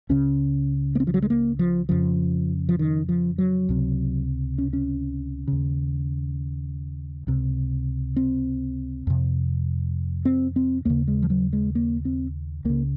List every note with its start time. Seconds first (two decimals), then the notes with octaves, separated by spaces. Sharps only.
0.09 C#2 C#3 C#4
0.95 A#3
1.00 C4
1.07 F3
1.14 F#3
1.22 G#3
1.30 A#3
1.59 F3
1.89 F2 C#3 F3
2.69 F3
2.79 D#3
3.09 F3
3.38 F#3
3.69 C#2 C3
4.58 C#4
4.73 C#4
5.48 D#2 C#3
7.27 C#2 C3
8.16 C4
9.07 F2 C3
10.25 C4
10.56 C4
10.85 D#2 C#3 A#3
11.08 G#3
11.23 F3
11.30 F#3
11.53 G#3
11.75 A#3
12.05 C4
12.65 C#2 C#3 A#3